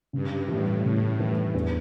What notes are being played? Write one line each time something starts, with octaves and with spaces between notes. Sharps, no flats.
G2 C#3
A2 E3 G3
A2 C#3
E3 G3
E2